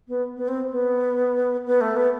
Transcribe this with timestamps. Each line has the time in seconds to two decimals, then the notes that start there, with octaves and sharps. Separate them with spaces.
0.08 B3
0.37 B3
0.48 C4
0.72 B3
1.66 B3
1.81 A3
1.96 B3